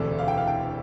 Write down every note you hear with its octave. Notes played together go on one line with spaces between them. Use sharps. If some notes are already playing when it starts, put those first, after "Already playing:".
Already playing: E1 D2 C3 E3 A3 A4 D5
F5
G5
F5
G5